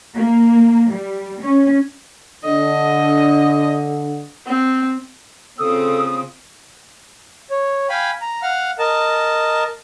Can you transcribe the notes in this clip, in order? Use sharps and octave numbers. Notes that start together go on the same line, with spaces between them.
A#3
G3
C#4
D3 D#5
C4
C#3 C4 F4 A4 D#6
C#5
F5 G5 G#5 B5
A#5
F5 F#5 F6
A#4 D#5 A5